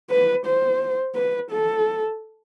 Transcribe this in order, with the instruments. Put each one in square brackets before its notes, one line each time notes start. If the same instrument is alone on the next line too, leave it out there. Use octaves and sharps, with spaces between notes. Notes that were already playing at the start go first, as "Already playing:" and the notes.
[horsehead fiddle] B4
C5
B4
A4